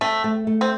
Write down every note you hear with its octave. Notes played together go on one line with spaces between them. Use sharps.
A3 C4
A3
A3
C4